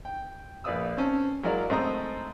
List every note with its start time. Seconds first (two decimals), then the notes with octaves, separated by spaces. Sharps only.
0.05 G5
0.64 A#1 B4 D5 F5 D#6 E6
0.97 C4 C#4 A5
1.43 F#3 G#3 E4 A#4 D5 F5
1.70 G#2 A3 C4 E5 A#5 D#6